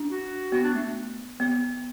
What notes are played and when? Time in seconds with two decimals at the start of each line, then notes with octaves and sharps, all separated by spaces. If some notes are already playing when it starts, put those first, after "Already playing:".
Already playing: D4
0.09 F#4
0.52 B3 F#4
0.63 D4
0.74 A3
1.40 B3